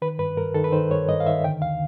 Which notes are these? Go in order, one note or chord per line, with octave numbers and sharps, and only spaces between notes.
D#3 B4
G2 B4
G2 A#4
D#3 A4
B4
D#3 C5
G2 C#5
G2 D#5
F5
D#3 E5
D3 G5
D#2 F5